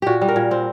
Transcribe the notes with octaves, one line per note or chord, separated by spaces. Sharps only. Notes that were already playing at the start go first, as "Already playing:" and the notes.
A#2 F#4 G4
G3
A#4
A#2
C4